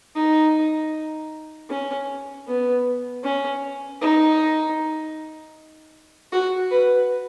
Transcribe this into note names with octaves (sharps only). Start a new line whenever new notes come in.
D#4
C#4
B3
C#4
D#4
F#4
B4